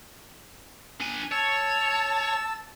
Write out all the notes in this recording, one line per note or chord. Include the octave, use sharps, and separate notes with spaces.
D4 G#5
C#5 A5 E6